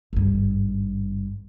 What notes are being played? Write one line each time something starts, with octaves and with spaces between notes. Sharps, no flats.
G#1 G2